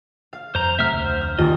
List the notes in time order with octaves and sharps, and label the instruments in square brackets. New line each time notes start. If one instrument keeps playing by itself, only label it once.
[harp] F5
[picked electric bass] F2 [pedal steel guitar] C5 A#5
[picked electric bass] C3 F#3 A3 [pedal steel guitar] E5 F6
[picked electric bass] F1 D2 [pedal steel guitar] C5
[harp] F6
[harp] D#1 [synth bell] F4 [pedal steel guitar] D#5